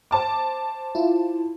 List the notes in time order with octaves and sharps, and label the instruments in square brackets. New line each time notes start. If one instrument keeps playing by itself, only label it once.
[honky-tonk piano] C5 A5 D6
[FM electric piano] E4 F4